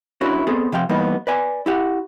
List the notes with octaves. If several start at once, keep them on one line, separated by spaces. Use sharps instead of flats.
C#4 D4 E4 F#4 A#4
B3 C4 G#4 A4
C3 F3 F5 G5
E3 G3 A#3 B3 D#4
B4 D5 G#5
E4 G4 F#5